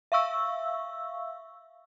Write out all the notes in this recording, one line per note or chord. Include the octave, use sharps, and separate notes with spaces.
E5 F5 C#6 E6